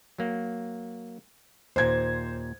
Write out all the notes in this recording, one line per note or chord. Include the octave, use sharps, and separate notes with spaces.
F#3 A#3
D#2 A#2 C5 G#6